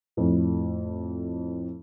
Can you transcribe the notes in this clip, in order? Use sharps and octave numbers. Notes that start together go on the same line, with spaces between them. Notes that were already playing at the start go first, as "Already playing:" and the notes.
F2 A2